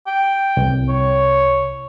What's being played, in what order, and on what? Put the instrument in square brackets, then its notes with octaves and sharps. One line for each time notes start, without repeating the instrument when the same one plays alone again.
[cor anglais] G5
[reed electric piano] C2
[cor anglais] C#5